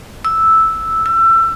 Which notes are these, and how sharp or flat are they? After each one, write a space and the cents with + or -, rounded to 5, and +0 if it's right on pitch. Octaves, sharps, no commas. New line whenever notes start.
E6 -5
E6 +25